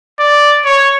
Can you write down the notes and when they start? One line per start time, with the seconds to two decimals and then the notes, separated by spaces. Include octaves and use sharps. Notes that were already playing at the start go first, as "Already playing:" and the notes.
0.20 D5
0.65 C#5